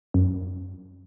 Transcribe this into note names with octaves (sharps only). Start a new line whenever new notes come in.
F#2